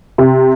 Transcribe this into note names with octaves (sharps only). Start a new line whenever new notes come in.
C3